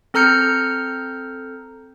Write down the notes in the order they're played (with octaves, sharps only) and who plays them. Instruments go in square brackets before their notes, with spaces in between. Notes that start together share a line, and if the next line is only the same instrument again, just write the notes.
[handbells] C4 A4 A#5 F6 G6 C#7